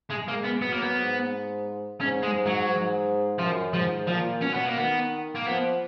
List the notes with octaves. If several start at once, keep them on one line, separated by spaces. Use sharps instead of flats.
G#3
G#3 A#3
B3
F#3 B3
A#3
B3
G#2
G#2 C#4
G#3
G#2
F#3
G#2
F#2 F3
G#2 F3
A#2 F3
B2 C#4
B3
A#3
D#3 B3
A#3
F3 B3